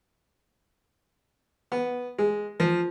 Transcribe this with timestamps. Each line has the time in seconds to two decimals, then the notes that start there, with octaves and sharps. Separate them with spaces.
1.72 B3
2.18 G#3
2.60 F3